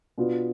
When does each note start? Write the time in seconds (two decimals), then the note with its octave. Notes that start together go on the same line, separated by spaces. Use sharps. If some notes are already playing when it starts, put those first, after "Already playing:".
0.18 B2 B3 D4 F4